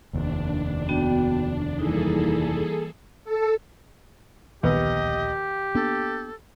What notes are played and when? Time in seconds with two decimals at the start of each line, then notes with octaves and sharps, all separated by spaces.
0.13 F1 D#2 D4
0.89 B3 F#4 G5
1.79 E3 G3 A#3 D#4 E4 G#4 A4
3.24 A4
4.63 D1 A#1 D#2 B3 G4 B4 D#5
5.75 A#3 B3 D4 A4